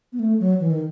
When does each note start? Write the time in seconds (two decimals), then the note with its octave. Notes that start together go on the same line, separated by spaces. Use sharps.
0.13 B3
0.19 A3
0.40 F#3
0.60 E3
0.70 D#3